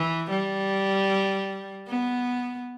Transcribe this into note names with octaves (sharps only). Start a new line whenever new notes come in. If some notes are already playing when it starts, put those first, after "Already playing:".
Already playing: E3
G3
B3